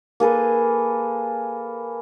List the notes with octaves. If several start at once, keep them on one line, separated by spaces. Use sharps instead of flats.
A#3 G#4 A4 B4